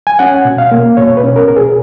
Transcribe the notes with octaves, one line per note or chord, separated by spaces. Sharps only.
G#5
C#4 F#5
B2
F5
A#3
B2 C#5
B4
C#4
A#4
B2 A#4
G#4